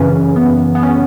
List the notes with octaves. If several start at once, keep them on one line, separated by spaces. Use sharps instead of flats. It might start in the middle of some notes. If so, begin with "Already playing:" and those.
Already playing: F#2 C#3 E3 C#4
B3
B3
C#4